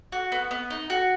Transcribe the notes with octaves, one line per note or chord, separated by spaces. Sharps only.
F#4
B3
B3
D#4
F#4